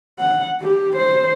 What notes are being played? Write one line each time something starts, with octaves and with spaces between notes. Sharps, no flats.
F#5
G4
C5